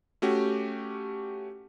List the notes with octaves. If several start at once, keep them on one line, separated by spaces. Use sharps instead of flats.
A3 C#4 F#4 G4